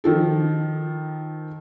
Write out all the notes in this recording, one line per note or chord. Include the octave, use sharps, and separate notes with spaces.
D#3 F3 A4